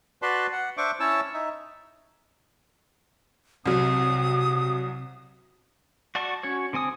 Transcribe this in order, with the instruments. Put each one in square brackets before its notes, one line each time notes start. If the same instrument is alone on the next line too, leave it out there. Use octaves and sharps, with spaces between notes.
[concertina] F#4 B4 D5 A5 B5 C6
F#5
D4 C5 E5 C#6 D6
C#4 E4 C#5 A5 E6
D#4 E5
[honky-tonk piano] C2 F#3 [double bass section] C3 [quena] D#6
[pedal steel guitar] F#4 D5 A5 C#6
C#4 F#4 C#5
D3 C4 G#5 D#6